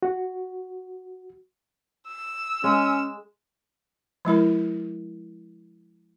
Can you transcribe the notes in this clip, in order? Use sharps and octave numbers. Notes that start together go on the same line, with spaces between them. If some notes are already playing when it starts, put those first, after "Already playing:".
F#4
E6
G#3 C#4
F3 G#3 E4 A#4